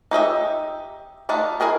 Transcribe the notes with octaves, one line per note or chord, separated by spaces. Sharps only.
D#4 G4 D#5 E5
A3 D4 D#4 F4
E4 F4 G#4 A#4 G5